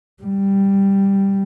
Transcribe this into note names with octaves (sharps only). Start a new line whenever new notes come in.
G3